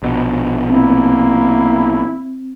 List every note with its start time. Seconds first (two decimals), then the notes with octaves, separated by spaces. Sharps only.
0.03 A#1 B2
0.70 A#3 C4 E4